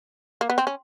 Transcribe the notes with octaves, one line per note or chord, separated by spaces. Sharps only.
A#3
B3
C4
C#4